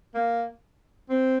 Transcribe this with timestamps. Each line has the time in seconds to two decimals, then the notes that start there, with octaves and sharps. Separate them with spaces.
0.15 A#3
1.10 C4